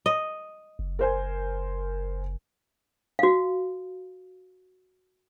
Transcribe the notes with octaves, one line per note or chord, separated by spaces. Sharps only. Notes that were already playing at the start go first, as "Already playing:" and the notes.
D#5
F#1
A#4 C5 G#5
F#4 F5